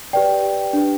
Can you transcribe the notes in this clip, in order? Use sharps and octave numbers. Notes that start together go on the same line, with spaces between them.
G4 B4 D5 G5
D4 G4 B4